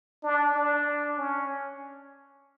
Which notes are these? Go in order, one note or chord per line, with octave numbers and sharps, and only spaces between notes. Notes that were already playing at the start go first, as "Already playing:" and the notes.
D4
D4
C#4